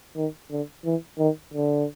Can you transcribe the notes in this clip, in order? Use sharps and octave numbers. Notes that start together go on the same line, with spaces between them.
D#3
D3
E3
D#3
D3